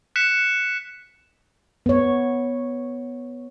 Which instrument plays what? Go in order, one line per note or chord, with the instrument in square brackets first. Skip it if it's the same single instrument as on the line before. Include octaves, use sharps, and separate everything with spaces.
[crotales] F#6 B6 C#7 E7
[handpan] B3 C#5